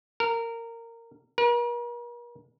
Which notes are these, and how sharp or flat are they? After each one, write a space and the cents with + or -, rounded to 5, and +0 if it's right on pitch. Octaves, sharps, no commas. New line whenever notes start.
A#4 -15
A#4 +45